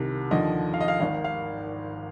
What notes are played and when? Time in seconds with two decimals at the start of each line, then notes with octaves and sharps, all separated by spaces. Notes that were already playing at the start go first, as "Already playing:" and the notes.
Already playing: C2 C3 D#3
0.31 D#2 D3 F3 D#5
0.74 F5
0.81 D#5
0.88 F5
1.00 G#1 G#2 D#3 F5
1.24 F5